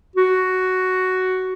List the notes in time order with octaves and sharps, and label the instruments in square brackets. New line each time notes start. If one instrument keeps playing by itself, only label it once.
[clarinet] F#4